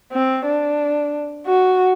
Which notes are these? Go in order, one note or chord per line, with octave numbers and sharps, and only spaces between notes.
C4
D4
F#4